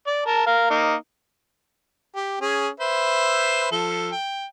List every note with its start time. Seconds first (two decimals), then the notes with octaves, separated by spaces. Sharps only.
0.07 D5
0.26 A#4 A5
0.47 A#4 F5
0.70 A#3 D#4
2.15 G4
2.41 C#4 G#4
2.80 B4 C5 E5
3.71 F3 A4
4.12 G5